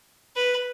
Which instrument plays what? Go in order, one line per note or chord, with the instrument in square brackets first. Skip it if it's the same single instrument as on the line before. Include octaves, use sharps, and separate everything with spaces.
[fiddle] B4